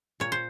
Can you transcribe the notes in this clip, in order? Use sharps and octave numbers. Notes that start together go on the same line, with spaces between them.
A#2 C#5
C5